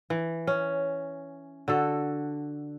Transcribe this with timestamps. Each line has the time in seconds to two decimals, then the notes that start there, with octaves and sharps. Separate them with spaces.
0.10 E3
0.47 C#4
1.68 D3 F#4 A4